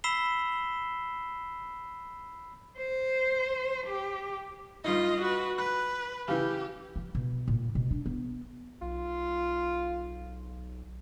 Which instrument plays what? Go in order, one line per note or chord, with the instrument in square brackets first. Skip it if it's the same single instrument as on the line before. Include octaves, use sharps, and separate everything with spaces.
[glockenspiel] B5 E6 B6 C7 E7 G7
[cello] C5
G4
[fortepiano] G2 D#4 [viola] F4 D#5
[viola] F#4 B4
[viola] B4 [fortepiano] F#6
[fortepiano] C#3 E3 [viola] G4
[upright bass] F3
B2
A#2
B2
D4
B3
[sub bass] B1 [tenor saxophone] F4